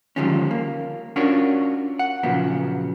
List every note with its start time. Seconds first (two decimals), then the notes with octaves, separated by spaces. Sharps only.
0.16 D3 D#3 F3 G3 G#3 C#4
0.51 A#3
1.16 C#4 D4 F4 F#4 A#4 C#5
1.99 F#5
2.23 A#2 C#3 F3 F#3 B3